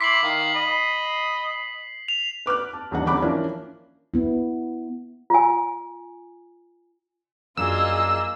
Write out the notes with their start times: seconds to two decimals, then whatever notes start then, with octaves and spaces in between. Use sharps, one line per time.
0.01 E4 C6 D6 B6 C7 F#7
0.23 D#3 F5
0.55 D#5 B5
2.08 F7
2.46 B4 D6 F6 F#6
2.73 A5
2.91 D#1 E2 D4 D#4 F#5
3.06 D#1 D3 B5 D6 F#6
3.22 E3 F3 A#3 C#4 D4
4.14 B3 E4
5.30 F4 G#5
7.57 F#2 A#3 D4 F4 G#4 D#5 E6